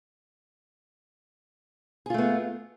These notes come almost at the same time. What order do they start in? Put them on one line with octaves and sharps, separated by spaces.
G#4 F4 A3 B3